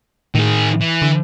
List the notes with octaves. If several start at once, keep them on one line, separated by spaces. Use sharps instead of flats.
A2 D#3 G#4
E3
D3